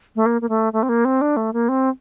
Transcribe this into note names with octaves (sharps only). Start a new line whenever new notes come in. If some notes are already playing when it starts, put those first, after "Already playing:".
A3
A#3
A#3
A3
A3
C4
A#3
C4
D4
A3
A#3
C4